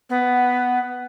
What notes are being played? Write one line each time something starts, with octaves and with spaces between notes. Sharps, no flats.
B3